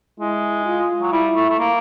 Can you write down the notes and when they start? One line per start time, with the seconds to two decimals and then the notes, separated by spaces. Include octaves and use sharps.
0.20 G#3 E4
0.66 F4
1.01 F#3
1.12 G3 E4
1.36 A3
1.49 A3
1.59 A#3